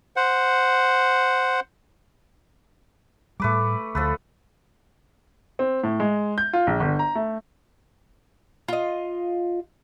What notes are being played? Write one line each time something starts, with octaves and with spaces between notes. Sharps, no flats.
C5 F#5
A2 G3 A3 B4 D6
D2 F3 A4 B4
C4
A2
G#3
G6
F4
A#1
G1
A#5
A3
F4 D#5